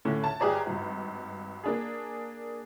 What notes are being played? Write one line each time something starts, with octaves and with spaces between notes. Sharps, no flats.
A2 D3 C#4
A5
G1 G4 G#4 D5 A#5
G#1 G2
A#3 D4 G#4